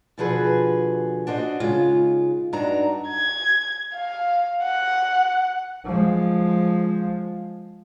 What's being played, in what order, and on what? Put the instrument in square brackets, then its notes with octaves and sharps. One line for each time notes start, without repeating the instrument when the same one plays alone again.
[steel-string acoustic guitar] B2 D3 F3 F#4 G#4 B4
D4 F#4 C5 C#5 D#5
C#3 G#3 D#4 F4
G2 D4 D#4 F#4 A#5
[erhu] G#6
F5
F#5
[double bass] F3 G#3